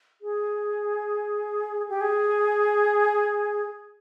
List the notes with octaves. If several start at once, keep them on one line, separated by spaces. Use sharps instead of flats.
G#4
G4
G#4